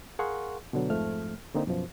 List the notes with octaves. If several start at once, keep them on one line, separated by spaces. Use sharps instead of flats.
G#4 A#4 F5 F#5 C6 C#6
B2 D3 F#3
F2 G#2 F3 A3 F6
D3 A#3 C4 D#4
F#2 B2 F3